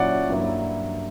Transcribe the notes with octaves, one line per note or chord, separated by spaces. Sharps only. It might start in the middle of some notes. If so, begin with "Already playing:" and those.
Already playing: A#2 F#3 C#4 E4 D5 F#5
G2 F#3 A#3 E4